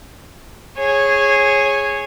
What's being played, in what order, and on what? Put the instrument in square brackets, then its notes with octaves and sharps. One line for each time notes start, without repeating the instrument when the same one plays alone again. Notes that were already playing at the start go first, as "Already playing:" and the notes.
[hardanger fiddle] G#4 C#5